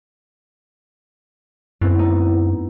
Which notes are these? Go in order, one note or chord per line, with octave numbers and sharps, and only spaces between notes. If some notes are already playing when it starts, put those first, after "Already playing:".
F#2 B3 C4 E4
A3 D#4